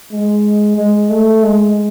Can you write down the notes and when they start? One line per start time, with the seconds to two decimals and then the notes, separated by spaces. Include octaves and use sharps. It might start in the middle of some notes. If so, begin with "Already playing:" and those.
0.11 G#3
0.77 G#3
1.10 A3
1.43 G#3